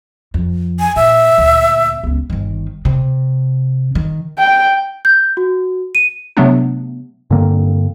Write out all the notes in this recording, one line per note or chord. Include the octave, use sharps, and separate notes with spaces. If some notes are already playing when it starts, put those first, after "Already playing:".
F2
G#5
A#2 E5
D2 A#2
C#2 B3
G1 D#3
C3
D#3
G5
G6
F#4
D#7
C3 F#3 A3 B3 D4
G2 D3 A#3 C4